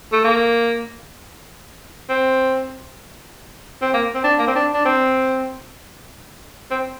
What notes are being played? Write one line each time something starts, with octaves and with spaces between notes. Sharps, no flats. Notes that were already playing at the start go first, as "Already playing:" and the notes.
A3
A#3
C4
C4
A#3
C4
D4
A#3
C4
D4
D4
C4
C4